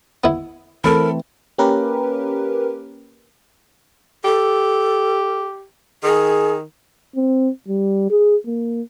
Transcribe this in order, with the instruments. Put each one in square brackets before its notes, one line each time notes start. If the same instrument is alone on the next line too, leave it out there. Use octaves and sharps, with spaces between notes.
[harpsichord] B3 E4
[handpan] E3 A3 C4 [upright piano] A4 B5 [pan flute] A#4
[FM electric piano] A#3 C#4 G4 A#4 B4
[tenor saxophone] G4 [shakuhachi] A4
[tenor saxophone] D#3 [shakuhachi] G#4
[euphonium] C4
G3
G#4
A#3